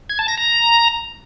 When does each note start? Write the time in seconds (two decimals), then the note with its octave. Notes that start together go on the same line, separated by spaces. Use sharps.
0.09 G#6
0.19 A5
0.28 A#6
0.38 A#5